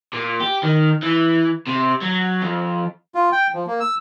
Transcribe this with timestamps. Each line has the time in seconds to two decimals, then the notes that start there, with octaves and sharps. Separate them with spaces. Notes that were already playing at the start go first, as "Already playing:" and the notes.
0.13 A#2
0.41 G4
0.63 D#3
1.03 E3
1.67 C3
2.01 F#3
2.41 F2
3.15 F4
3.32 G5
3.54 F3
3.67 A#3
3.80 E6